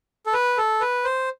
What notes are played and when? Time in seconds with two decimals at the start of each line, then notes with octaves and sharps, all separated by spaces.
0.26 A4
0.33 B4
0.57 A4
0.81 B4
1.05 C5